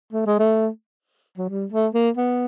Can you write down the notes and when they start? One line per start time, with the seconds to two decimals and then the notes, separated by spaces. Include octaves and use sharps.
0.13 A3
0.26 G#3
0.39 A3
1.38 F#3
1.49 G3
1.72 A3
1.94 A#3
2.17 B3